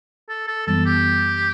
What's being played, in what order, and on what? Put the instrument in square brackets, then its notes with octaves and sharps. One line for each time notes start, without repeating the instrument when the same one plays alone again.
[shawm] A4
A4
[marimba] F#2 E3 G3 B3 [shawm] A4
[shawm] G4